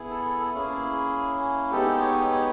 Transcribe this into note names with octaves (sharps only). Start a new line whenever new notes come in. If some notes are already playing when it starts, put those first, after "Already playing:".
Already playing: B3 E4 G#4
A4
A4
A4
A#3 C#4 E4 G#4
G#3 B3 D#4 G4 A4
C#5
C#5